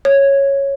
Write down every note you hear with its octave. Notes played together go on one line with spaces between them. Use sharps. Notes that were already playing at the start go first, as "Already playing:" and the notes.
C#5